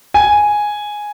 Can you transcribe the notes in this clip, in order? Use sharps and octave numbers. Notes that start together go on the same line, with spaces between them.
G#5